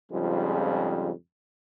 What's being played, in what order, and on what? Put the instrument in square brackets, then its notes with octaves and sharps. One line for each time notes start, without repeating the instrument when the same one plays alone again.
[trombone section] F2 G#2 C#3 F3 G3